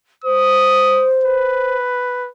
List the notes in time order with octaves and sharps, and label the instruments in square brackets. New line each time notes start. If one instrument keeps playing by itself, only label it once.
[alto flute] C5 [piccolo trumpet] D#6
[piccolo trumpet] B4